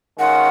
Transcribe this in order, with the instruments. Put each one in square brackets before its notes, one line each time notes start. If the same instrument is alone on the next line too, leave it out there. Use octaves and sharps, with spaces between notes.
[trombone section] D#3 G#3 C#4 F4 [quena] F#5